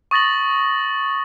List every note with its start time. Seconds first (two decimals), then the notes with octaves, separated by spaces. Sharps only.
0.11 C#6 D#6 A6 A#6 F#7